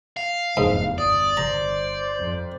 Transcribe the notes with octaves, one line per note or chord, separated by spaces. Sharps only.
F5
F1 E2 G#2
G1 D5 D#6
C5 A#5
F2